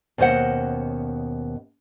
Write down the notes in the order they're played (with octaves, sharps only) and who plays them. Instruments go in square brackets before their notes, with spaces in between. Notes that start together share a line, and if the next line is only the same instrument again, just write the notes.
[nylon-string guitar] D#2 B2 C#4 C5 D#5 F#5